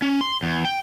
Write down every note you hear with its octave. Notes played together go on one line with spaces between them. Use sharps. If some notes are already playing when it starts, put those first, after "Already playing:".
C#4
C6
E2
G5